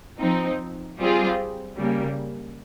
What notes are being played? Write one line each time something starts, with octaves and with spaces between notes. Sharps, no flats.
F3 C4 D#4
G3 C4 F4 G#4
C#3 G3 A#3